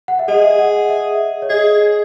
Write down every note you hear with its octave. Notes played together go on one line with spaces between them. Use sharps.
F#5
E5
G#4 D#5
F#5
E5
C#5
G#4 D#5